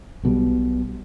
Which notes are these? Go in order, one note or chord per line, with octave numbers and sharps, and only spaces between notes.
B1 B2 F#3 G3